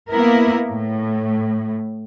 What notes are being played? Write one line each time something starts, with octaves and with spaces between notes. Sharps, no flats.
A#3 B3 E4 A#4
A2